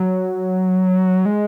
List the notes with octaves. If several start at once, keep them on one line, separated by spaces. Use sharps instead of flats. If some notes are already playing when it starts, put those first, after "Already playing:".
Already playing: F#3
G#3